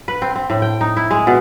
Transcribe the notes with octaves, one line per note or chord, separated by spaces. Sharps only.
B4
C4
C4
A2
G5
D#4
E4
G#3
B2